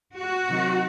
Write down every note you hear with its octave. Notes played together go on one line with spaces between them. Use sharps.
F#4
C3 D#3 F#3